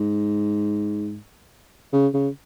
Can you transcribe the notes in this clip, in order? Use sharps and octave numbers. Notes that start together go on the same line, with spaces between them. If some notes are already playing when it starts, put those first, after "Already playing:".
Already playing: G#2
C#3
C#3